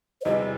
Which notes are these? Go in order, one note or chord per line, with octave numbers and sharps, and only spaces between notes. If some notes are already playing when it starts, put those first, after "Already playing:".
C5
E2 C3 E3 G3 D#5